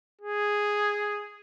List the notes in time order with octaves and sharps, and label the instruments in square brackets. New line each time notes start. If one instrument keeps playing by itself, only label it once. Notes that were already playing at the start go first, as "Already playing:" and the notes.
[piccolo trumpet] G#4